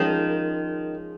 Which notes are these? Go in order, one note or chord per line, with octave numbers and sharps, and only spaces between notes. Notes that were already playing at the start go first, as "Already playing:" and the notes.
Already playing: D#3 F3 G#3 C#4